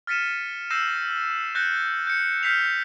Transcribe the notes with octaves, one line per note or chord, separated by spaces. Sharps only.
F6 A6 B6 C#7 D#7 E7
E6 G6 A#6 C7 D#7 E7
F#6 G6 A6 A#6 C7 C#7
G6 C#7
F6 G6 B6 C7 F7